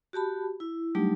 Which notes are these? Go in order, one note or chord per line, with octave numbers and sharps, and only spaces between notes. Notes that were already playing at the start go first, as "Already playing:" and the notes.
F#4 G4 A5 B5
E4
F#3 G3 A3 D4 D#4 G4